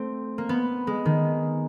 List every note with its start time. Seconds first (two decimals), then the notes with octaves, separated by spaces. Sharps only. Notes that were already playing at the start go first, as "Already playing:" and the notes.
Already playing: A3 C4
0.38 A#3
0.49 B3
0.87 G#3
1.05 D#3